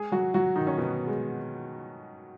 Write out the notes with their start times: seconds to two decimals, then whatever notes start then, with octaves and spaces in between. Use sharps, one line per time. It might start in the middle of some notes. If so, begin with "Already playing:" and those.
Already playing: G#3 G#4
0.12 F#3 F#4
0.34 F#3 F#4
0.56 D#3 D#4
0.67 C#4
0.78 B2 B3
1.07 G#3